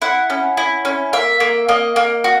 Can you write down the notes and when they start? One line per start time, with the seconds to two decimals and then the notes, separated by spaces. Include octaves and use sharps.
0.02 E4 F#5
0.30 C#4
0.57 E4
0.85 C#4
1.13 A#3 E5
1.40 A#3
1.69 A#3 D#5
1.96 A#3
2.24 F#4